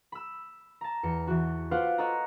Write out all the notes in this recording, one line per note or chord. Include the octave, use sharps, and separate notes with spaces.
B5 E6
A5 A#5
E2 C#7
E3 F#4
F4 B4 C5 D5 F5 F#5
A4 C#5 D#5 F#5 A#5